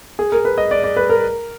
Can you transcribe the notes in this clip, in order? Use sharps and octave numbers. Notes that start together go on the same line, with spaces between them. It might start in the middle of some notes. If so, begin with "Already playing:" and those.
G#4
A#4
B4
D#5
D5
D5
B4
A#4